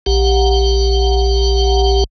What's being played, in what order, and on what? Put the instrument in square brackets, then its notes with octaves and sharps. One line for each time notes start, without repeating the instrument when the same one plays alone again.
[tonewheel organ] A#1 G4 F#5